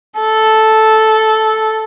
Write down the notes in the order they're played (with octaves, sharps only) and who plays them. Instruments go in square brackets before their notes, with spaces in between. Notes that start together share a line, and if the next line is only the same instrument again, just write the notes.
[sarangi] A4